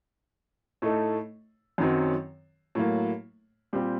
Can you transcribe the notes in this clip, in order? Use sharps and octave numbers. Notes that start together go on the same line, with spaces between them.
A2 A3 D#4 A4
F#2 D#3 F#3 C4
A2 F#3 A#3
A#2 G3 C4 G4